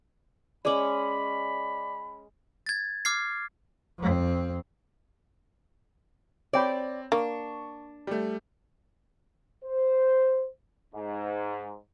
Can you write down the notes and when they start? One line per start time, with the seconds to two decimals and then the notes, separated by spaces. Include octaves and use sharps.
0.65 G#3 C#4 D5 B5 D6 F#7
2.66 G#6 A6
3.05 D6 F6 G#6 C7
3.98 F2 C4
6.53 C4 C#5 D5 G5 B5
7.12 A#3 D4 C#6
8.07 G3 A3
9.64 C5
10.94 G#2